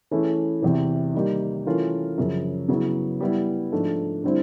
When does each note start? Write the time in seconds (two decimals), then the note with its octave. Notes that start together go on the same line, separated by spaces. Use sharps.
0.11 E3 A3 C#4 E4 G#4
0.62 E2 C3 E3
1.14 D#3 G3 A#3 D#4 G4
1.66 E3 A3 C#4 F4 A#4
2.18 F#2 C#3 F3
2.69 C#3 F#3 B3 E4
3.20 G3 B3 E4
3.72 G#2 F3 A3 D4
4.24 D3 G3 C4 E4